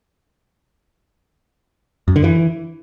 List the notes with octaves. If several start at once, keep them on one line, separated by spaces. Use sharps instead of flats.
F#2
D3
E3